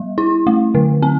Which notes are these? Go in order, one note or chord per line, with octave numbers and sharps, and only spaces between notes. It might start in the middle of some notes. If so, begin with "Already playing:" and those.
Already playing: G3
E4
A3
D3
C4